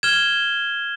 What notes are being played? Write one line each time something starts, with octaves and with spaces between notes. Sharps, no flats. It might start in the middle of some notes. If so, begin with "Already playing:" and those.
F6 G#6 E7 G7